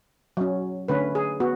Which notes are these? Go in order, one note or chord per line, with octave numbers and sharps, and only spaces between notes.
F#3 C#4
D3 A3 C#4 B4
G#4
B3 F#4